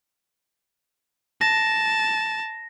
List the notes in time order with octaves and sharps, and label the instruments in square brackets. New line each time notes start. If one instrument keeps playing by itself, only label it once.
[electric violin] A5 [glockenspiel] A#6